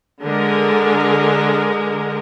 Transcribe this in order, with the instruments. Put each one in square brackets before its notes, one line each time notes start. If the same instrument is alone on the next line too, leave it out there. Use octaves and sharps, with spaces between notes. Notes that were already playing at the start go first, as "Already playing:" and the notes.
[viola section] D3 G#3 A#4